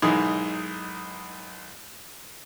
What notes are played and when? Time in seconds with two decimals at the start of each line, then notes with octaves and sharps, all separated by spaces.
0.02 B1 G#2 D#3 E3 D#4 G#4